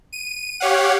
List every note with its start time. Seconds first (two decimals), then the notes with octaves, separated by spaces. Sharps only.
0.13 D#7
0.60 G4 C#5 F5 F#5